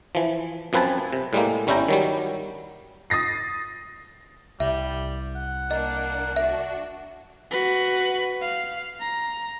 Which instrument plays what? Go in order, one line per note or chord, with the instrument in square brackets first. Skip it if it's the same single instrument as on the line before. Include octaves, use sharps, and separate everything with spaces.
[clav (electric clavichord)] E3 F3
F#2 F3 C4 B4 G#5 A5
C3
A2 G3 G#3 A#3
G1 G3 C#4 E4 G5 A#5
D#3 F#3 G3
[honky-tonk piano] D#6 A6 A#6 C7
[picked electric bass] C2 [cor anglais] G3 [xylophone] E5
[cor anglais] F#5
[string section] A#3 D4 [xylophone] D#5
[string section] D4 F#4 [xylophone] E5
[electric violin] F#4 B4
F5
A#5